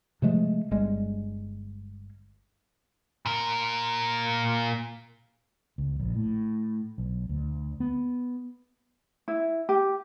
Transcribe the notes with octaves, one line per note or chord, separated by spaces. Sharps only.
C3 F3 G#3 A3
G1 G3 G#3
A#2 A#4
C#2
A#1
A2
B1
D2
B3
E4
G4